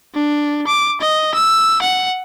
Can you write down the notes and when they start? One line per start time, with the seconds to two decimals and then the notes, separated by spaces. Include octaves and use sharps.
0.15 D4
0.67 D6
1.01 D#5
1.34 E6
1.82 F#5